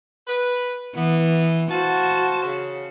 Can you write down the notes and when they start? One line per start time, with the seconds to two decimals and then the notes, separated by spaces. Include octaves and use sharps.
0.28 B4
0.96 E3 B3
1.71 F#4 C5 F5 A5
2.43 C#3